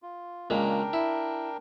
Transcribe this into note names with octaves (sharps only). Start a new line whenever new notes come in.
F4
A#2 C#3 G#3 D4 A#4 G5
E4